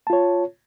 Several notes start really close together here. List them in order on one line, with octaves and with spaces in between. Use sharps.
A5 F4 C#5